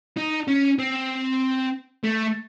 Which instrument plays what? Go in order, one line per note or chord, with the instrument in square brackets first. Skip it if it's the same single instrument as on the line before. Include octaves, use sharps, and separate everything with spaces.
[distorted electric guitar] D#4
C#4
C4
A3